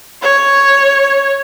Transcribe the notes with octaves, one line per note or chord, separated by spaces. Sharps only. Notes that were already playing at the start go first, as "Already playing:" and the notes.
C#5